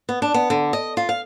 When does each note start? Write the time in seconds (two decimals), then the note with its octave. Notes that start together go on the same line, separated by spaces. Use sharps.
0.09 B3
0.22 D4
0.34 B3
0.50 D3
0.73 D#5
0.97 F4
1.09 F5